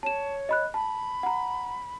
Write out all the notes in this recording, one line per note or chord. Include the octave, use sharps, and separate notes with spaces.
C#5 A5 E7
D#5 B5 F#6
A5 B5
F#5 A#5